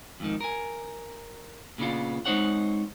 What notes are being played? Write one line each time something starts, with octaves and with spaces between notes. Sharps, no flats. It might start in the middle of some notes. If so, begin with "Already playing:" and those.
F2 G#2 D#3
A#4 G#5
A#2 C#3 B3 D4 F4
G#3 C4 D#4 C5 C#5 F#5